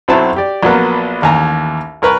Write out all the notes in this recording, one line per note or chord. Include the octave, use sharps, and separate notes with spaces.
B1 F#3 C4 E4 A5
G4 D5
A#1 F#3 A#3 B3
A1 D#2 G#5 A#5
C2 A#4 B4 C#6